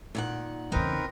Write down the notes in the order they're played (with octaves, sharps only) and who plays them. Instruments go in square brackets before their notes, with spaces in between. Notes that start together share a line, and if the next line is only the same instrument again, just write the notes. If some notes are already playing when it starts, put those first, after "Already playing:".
[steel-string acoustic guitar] A#2 D#3 F#5
[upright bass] E2 C#3 [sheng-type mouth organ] C4 A#4 B4 [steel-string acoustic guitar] D#4